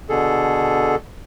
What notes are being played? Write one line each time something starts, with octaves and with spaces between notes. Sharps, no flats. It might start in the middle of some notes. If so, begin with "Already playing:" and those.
B2 D3 G#4 A4